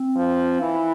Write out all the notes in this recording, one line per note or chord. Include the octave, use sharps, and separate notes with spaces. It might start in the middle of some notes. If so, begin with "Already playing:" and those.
Already playing: C4
F3
E3 E4